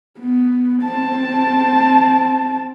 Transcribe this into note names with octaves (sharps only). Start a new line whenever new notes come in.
B3
C4 A5